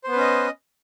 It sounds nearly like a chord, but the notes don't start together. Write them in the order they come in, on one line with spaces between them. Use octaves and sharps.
C5 B3 B4 C#4 D#5